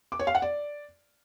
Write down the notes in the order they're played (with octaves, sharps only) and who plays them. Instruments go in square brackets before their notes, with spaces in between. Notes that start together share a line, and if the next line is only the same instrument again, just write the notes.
[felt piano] D6
C#5
F5
F#5
D5